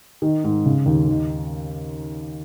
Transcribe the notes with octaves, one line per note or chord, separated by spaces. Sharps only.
D#3
G#2
C#3
D#2
D#3